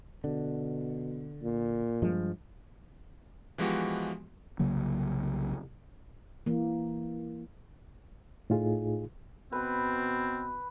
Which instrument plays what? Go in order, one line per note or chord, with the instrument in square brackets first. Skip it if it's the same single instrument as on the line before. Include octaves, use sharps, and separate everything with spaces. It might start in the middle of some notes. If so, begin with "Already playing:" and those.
[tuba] B2 [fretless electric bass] D3
[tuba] A#2
[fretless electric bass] G2 F3 G#3
[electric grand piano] E3 F3 G#3 B3 F#4 G4
[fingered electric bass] C2 C#3 F#3 A#3
[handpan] E3 A#3
[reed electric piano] A2 D#4 F4 G#4
[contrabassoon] B2 [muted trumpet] C4 [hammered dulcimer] B4 B5